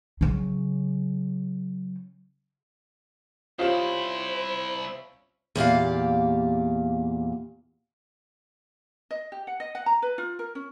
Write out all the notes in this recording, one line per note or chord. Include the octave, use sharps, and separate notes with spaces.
C#3 F#3
C2 C#4 E4 F4 G4 C5 F5 E7
E2 A#2 G4 F5
D#5
G4
F#5
D#5
F#5
A#5
B4
F4
A#4
C#4